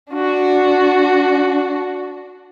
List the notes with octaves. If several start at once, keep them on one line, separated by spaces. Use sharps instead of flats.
D4 F#4